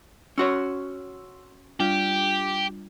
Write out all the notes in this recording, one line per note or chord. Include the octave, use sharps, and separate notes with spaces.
C#4 F#4 C#5 C6 E6
G3 D4 F4 G4